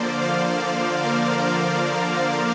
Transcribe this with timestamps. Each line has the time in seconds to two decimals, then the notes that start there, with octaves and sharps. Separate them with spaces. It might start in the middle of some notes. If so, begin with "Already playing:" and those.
Already playing: D3 F3 A#3 C5 D5
0.21 F5
1.04 A#4
1.47 C5
1.88 D5